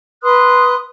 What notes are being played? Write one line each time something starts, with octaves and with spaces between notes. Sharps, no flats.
B4 C6 D#6 F#6